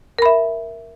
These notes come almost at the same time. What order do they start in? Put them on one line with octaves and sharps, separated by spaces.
A#4 B5 E5